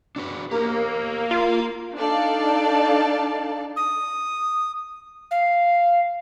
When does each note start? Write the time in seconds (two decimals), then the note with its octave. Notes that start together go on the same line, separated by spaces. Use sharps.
0.16 D4 F#4 B4
0.51 A#3 G4 A#4
1.31 F4 F5
1.96 D4 D#4 A4 D5 F5 A5
3.76 D#6
5.31 F5